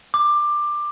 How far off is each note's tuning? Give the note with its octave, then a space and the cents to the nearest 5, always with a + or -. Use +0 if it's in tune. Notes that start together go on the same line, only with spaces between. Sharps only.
D6 +15